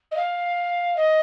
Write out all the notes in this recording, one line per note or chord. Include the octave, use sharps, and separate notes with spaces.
D#5
F5
D#5